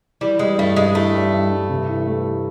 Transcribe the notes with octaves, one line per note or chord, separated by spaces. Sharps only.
E3 G3
G3 G#3
G2 A3
G2 G#3
E3 A3
G3
G2
G2
C3
E3
A3